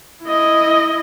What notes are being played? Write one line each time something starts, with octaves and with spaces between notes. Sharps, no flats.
E4 D#5